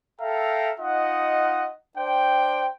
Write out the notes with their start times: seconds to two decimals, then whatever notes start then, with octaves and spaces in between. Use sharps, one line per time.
0.20 A4 E5 F5 G5 A#5
0.79 D#4 F4 D#5 F#5
1.97 D4 C5 G5